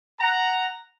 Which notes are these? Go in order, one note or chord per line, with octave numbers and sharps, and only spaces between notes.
F#5 A#5